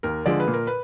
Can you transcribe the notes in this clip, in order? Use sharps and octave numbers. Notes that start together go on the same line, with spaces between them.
D#2 A#4
D3 F3 G#3 D5
B4
A#2
A#4
B4